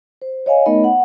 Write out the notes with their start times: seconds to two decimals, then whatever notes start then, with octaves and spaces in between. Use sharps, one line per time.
0.22 C5
0.46 C#5 D#5 F5 G#5
0.66 A3 B3 D#4 A#4 D#5 B5
0.84 F#5